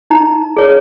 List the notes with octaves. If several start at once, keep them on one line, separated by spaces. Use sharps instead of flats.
D#4 A#5
G#4 C#5